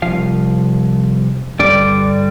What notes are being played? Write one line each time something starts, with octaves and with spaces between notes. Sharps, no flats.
C2 A#2 F3 F5
G2 D3 G3 D5